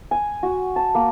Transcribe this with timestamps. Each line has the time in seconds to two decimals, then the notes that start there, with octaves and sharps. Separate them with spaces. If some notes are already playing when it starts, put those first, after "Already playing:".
0.11 G#5
0.43 F#4
0.76 A5
0.95 A#3